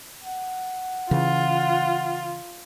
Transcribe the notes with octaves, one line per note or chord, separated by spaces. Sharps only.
F#5
C#3 E3 F4